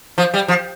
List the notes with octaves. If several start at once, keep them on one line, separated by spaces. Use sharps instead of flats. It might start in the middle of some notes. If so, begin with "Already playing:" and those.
F3
G3
F3